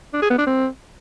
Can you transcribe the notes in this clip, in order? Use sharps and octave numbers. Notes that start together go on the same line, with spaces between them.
D4
G#4
B3
D4
C4